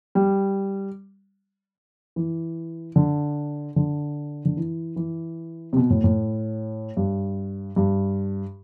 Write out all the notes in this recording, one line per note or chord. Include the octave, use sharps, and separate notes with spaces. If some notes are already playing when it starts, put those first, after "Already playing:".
G3
E3
D3
D3
D3
E3
E3
C3
B2
A2
A2
G2
G2